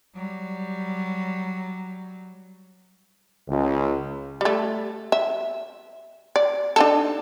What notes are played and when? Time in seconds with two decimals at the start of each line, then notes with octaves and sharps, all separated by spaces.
0.16 F#3 G3
3.49 C#2
4.41 G3 A3
5.12 E5
6.36 D5
6.76 D4 D#4 A4